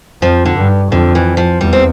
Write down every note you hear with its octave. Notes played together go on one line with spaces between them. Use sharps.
F2 F3
D3
G2
F2 D3
E3
F3
E2 G3
C4